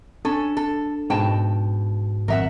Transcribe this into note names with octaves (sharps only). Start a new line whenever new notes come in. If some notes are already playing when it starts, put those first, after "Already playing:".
C#4 D4 A4
A4
G#2 B2 G5 A5
G#1 F2 A#4 E5 F#5